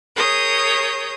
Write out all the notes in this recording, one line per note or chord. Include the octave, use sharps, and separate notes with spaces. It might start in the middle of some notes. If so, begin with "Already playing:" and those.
G#4 A#4 C#5 D#6 G6